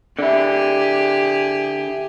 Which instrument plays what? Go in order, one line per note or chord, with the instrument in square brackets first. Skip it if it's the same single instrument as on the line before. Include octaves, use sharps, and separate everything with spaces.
[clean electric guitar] D3 E4 [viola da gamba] G4 G#4